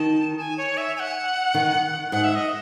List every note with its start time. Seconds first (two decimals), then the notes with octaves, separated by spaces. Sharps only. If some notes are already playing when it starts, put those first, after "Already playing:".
Already playing: D#3 A5
0.39 G#5
0.58 C#5
0.77 E5
0.96 G#5
1.00 F#5
1.54 D#3
2.12 G#2 F#5
2.24 E5
2.35 D#5